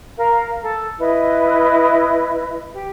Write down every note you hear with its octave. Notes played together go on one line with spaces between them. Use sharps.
A#4 F5
A4
E4 B4 D#5
G4